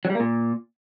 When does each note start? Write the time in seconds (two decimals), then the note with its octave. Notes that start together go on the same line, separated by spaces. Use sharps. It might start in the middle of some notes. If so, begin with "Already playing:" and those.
0.05 F#3
0.10 G3
0.15 A#3
0.20 A#2